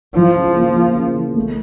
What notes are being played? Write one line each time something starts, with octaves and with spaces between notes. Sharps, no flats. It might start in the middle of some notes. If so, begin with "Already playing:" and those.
F3 E4
C#3
A#3
A#3
C#3
E3
A3